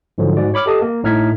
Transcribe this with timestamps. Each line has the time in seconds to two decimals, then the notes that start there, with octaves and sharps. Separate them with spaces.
0.18 G#2 D3 F3 F#3
0.37 G#2 F#4 D5
0.54 C#5 B5 D6 F6
0.66 G4 A4 D#5 A5 D#6
0.82 A#3
1.03 G#1 A2 D#4 F6 G#6 B6